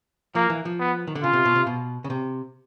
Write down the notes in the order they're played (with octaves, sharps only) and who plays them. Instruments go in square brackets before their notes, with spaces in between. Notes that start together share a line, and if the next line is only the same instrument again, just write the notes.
[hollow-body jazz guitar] F3 [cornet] A#3
[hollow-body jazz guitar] E3
F3
[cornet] B3
[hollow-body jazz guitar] D#3
D3
[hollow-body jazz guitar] C#3 [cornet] F4
[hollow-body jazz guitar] C3
B2
C3
B2
C#3
C3